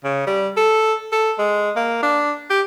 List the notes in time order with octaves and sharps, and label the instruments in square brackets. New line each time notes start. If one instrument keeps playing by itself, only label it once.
[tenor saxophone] C#3
G3
A4
A4
G#3
A#3
D4
G4